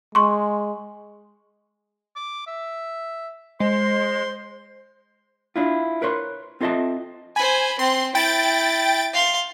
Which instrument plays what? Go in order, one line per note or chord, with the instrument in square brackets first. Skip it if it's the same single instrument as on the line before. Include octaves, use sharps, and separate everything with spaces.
[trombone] G#3 [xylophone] C6 C#6
[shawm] D6
E5
[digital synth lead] G#3 [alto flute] C5 [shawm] C6
[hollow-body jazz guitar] D4 E4 F4
A#4 B4 C#5 C6
C4 F4 A4 D#5 E5 A5
[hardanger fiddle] C5 B5 [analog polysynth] G#5
[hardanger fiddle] C4 [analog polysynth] C6
[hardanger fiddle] E4 [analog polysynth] G5 A6 D7
[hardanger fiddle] F5 C6